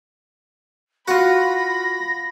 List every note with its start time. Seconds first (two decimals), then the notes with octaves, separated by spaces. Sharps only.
1.08 F4 F#4 F#5 B5 A#6